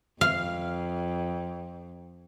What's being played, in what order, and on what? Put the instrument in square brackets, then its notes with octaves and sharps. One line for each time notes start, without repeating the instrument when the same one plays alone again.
[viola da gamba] F2 [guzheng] F5